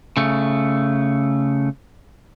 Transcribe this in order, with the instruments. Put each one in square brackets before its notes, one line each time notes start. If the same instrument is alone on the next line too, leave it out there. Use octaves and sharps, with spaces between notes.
[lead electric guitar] C#3 A3